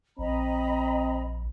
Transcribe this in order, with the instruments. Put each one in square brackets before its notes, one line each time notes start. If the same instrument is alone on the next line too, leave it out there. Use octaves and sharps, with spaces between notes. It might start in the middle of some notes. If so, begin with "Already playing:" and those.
[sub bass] A#1 [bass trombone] C4 [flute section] D#5 A#5 B5